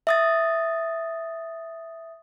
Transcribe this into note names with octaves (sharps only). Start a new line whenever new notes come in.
E5 D#6 A6